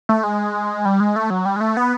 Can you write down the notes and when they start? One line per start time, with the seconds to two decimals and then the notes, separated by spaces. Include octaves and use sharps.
0.09 A3
0.24 G#3
0.85 G3
1.00 G#3
1.16 A3
1.30 F#3
1.45 G3
1.56 G#3
1.61 A3
1.77 B3